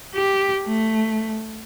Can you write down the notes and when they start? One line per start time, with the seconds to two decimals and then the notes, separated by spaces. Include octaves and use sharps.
0.14 G4
0.66 A3